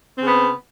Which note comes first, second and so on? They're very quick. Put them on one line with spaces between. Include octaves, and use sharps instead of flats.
C4 C#3 B3